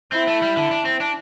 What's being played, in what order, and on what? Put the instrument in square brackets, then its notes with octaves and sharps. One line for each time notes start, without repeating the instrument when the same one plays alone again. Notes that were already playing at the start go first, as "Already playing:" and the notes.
[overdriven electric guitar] C4 [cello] E4
[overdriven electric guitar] A3
G3
D3
D4
C4
D4